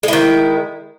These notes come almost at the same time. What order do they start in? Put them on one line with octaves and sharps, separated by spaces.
G#3 E4 D#3